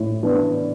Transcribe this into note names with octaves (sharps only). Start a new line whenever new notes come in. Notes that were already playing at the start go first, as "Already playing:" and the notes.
Already playing: A2
E3 B3 D4